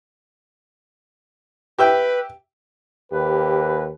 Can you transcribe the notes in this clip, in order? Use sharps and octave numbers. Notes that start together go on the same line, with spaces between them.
G4 B4 E5 G5
D#2 G4 B4